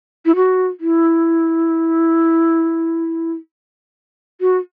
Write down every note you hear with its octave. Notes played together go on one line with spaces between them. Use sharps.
E4
F#4
E4
F#4